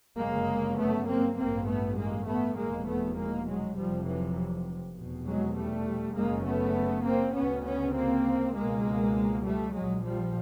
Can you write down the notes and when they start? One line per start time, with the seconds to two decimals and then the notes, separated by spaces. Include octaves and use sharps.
0.18 G1 F#2 C#3 G#3 A#3
0.78 A3 B3
1.08 A#3 C4
1.37 A1 G2 A#3 C4
1.67 A3 B3
1.98 G#3 A#3
2.27 A3 B3
2.57 F1 E2 B2 G#3 A#3
2.88 A3 B3
3.17 G#3 A#3
3.47 F#3 G#3
3.77 F1 F2 C3 F3 G3
4.06 E3 F#3
4.96 F1 E2 B2
5.27 F#3 G#3
5.56 G3 A3
6.16 F#1 F#2 C#3 G#3 A#3
6.45 A3 B3
7.05 A#3 C4
7.35 D2 C#3 B3 C#4
7.65 B3 C#4
7.95 A#3 C4
8.55 C#2 B2 G#3 A#3
9.45 G3 A3
9.74 A#1 A#2 F#3 G#3
10.04 F3 G3